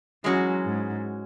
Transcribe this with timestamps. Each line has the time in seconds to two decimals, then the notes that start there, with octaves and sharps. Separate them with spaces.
0.24 E3 F#3 G#3 C#4 F#4
0.65 G#2